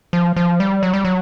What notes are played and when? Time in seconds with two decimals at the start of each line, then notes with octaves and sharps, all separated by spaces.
0.13 F3
0.36 F3
0.60 G3
0.83 F#3
0.94 G3
1.05 F#3